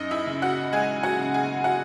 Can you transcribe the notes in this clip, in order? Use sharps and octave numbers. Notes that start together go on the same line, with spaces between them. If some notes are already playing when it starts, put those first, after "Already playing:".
Already playing: F#2 D#4 D#5
E4 E5
C#3
F#4 F#5
G#3 G#4 G#5
F#4 F#5
C#3
G#4 G#5
F#4 F#5